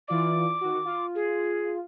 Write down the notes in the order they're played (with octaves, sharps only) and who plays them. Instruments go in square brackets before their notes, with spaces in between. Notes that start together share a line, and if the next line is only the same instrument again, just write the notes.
[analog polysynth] E3 F4 D5 [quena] D6
[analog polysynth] D#3 F#4
F4
[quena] G#4